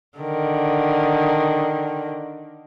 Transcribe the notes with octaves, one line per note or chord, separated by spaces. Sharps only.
D3 D#3